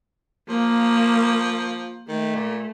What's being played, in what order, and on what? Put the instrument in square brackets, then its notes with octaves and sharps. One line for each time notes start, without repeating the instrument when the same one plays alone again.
[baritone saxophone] F3 [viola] A#3
[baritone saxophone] D#3 [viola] A3
[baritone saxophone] A#2